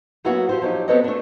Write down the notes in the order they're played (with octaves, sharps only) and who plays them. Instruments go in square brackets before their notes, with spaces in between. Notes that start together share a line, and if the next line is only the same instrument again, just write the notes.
[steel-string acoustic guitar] F#3 A#3 B3 C#4 E4 F#4
F3 G4 C5
F3 F#3 D#4 G4
B3 C4 A4 B4 C#5 D#5
A3 D4